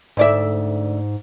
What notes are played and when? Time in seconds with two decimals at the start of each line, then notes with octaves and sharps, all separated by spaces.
0.17 D2 G#2 D5 E5